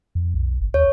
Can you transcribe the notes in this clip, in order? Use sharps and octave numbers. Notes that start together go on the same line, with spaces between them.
F2
B1
G1
D#2 C#5